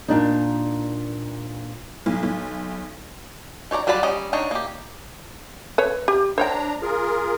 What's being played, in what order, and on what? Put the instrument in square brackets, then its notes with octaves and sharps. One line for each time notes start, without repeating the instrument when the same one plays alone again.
[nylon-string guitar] A#2 D4 D#4
[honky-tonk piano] B1
B1
[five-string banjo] D#4 C#5 D5 A#5
F#3 G3 F4 D5 B5
G3 C#4 D#5 A#5
D4 D#4 C#5 A#5
A#3 G4
[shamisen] B4 C#5
G4
[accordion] D4 A#5 [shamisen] C5 C#5 G5
[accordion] F4 G#4 A#4